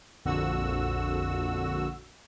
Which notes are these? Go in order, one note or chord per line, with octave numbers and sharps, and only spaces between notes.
A#1 F2 D3 F#4 E6